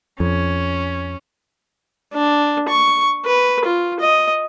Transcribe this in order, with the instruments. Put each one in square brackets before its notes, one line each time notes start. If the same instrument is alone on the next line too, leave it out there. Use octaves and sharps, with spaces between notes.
[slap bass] F2 [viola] C#4
[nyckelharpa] D4
C#6
B4
F4
D#5